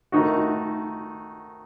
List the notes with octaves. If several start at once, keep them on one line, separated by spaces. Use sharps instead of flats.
D#3 A3 D#4 F#4